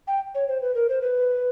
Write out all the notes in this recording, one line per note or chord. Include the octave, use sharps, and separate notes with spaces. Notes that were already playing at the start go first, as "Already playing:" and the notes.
G5
C#5
C5
B4
A#4
C5
B4